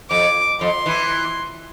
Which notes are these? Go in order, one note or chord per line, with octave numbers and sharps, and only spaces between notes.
F2 D6
F2 C6
E3